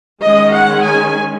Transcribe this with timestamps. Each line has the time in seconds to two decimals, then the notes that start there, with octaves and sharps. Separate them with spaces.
0.22 D#3 G#3 C#4 D#5
0.54 F#5
0.85 G#5